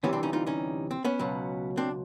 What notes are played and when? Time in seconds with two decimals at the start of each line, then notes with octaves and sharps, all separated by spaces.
0.03 D2 C3 E3 G3 B3 C#4
0.13 C4 D4
0.23 C#4 D#4
0.33 D#4 F4
0.47 C#4 D#4
0.91 C4
1.05 B3 C#4
1.19 C#2 B2 F#3
1.77 C4 D4